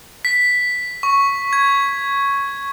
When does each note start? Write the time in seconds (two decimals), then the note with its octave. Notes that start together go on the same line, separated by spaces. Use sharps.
0.25 B6
1.03 C#6
1.53 G#6